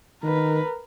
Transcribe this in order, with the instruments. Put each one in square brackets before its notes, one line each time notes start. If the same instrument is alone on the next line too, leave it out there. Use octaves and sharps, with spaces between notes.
[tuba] D#3 [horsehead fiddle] A#4 B4